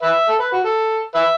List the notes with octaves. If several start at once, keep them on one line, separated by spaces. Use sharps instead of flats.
B4 E5
A4
B4
F#4
A4
B4 E5